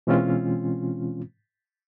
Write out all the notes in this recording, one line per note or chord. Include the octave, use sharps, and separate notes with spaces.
B2 E3 G#3 C4 C#4 F4